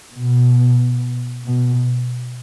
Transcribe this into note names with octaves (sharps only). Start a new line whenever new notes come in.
B2
B2